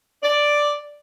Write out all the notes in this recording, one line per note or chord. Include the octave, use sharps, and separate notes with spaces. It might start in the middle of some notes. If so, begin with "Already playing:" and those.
D5